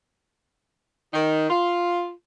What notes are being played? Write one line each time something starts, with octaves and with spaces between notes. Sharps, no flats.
D#3
F4